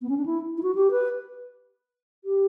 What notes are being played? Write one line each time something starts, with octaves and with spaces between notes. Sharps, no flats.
B3
C#4
D4
E4
E4
F#4
G4
B4
G4